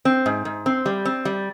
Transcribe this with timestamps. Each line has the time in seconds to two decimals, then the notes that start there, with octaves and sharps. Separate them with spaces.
0.05 C4
0.26 G#2
0.45 G#2
0.66 C4
0.86 G3
1.05 C4
1.25 G3